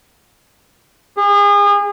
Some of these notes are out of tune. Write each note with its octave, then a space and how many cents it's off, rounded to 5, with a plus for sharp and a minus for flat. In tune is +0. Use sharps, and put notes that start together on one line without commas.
G#4 -35